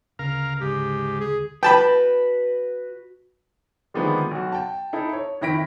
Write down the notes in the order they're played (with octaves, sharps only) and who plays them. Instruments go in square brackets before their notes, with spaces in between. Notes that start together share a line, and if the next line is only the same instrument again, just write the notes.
[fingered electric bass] D2 C#3 [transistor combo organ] A#4 F5
[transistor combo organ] G#2 [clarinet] G4
[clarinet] G#4
[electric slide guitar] F#4 B4 [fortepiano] G5 A5 B5
[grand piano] D3 D#3 F3 G#3 A#3 B3
B1 F#4
G5 A5
D#4 E4 A4
C#5
F2 D#3 E4 A#6 B6 D7